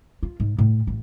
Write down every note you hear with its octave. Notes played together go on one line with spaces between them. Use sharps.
F4
G#2
A2
A1